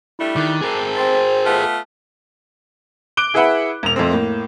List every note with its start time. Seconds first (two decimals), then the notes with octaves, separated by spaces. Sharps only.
0.19 G3 A3 D4 E4
0.36 D#3 D6 F#6 A6
0.61 A3 C4 G#4 A#4
0.96 C5 G5 C6 A6
1.46 A3 B3 F4
3.17 D6 F#6 D7 G7
3.34 E4 G#4 B4 E5 F#5 B5
3.83 E1 F7
3.96 F2 A3 C4
4.11 A2 A#3